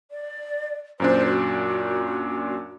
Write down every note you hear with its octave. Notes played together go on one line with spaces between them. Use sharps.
D5
F#2 A#2 D4 C5
F#4